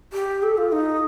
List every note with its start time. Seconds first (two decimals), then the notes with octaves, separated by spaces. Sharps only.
0.13 G4
0.43 A4
0.57 F4
0.72 D#4